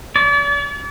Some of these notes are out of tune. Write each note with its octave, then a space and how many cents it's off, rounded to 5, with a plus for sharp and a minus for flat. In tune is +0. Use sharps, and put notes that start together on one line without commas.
D5 -40